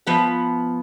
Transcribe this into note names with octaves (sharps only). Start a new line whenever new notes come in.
F3 B3 E5